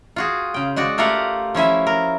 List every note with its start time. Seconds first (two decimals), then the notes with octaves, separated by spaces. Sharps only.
0.16 F4 F#4 G#4
0.54 C#3 G5
0.76 G#3 F#4 D5
0.98 A3 F4 G4 A#4 F5 F#5
1.55 F3 C#4 E4 E5
1.87 A#4